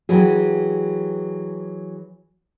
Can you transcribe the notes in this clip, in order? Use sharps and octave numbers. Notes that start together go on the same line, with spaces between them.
E3 F#3 G4 G#4